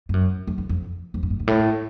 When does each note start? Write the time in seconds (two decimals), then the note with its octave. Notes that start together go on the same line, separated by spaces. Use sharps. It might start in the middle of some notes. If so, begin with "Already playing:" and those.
0.09 G2
0.14 F#2
0.47 F2
0.58 E2
0.69 F2
1.14 F2
1.23 G2
1.30 G#2
1.40 G2
1.47 A2